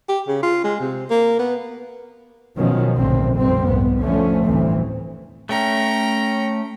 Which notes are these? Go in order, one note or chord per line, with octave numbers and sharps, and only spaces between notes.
G4
C#3
F4
G#3
C3
A#3
B3
B2 D#3 F3 F#3 C#4
A#1 F2 G#2 D3 A3 C4
F1 F2 G3 C4
C2 G#2 B3
D3 F3 A3 C#4
G1 D2 A2 E3 C4
A3 C#4 G5 A#5